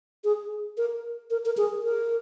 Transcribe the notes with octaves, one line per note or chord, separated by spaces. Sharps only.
G#4
A#4
A#4
A#4
G#4
A#4